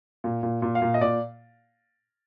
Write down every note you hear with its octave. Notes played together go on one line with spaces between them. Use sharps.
A#2
A#2
A#2
F5
A#2
D#5
A#2 D5